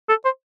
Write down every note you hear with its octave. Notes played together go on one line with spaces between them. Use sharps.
A4
C5